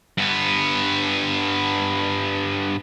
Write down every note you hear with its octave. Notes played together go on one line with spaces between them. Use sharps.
G2 B3